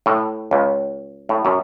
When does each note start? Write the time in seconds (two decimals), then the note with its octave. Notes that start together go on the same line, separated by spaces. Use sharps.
0.06 A2
0.51 C#2
1.29 A2
1.45 F#2